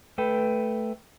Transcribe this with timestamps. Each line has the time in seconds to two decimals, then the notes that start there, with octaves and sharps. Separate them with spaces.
0.18 A3 A4 B4 G5